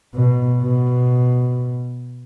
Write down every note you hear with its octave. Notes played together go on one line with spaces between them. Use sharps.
B2
B2